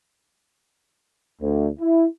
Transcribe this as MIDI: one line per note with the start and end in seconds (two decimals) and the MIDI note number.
1.40 1.67 38
1.79 2.05 64